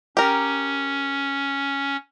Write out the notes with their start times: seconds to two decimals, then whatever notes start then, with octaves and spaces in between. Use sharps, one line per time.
0.17 C#4 G4 A#4